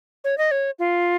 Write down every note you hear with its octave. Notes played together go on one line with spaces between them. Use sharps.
C#5
D#5
C#5
F4